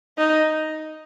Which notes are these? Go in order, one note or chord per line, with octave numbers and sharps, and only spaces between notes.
D#4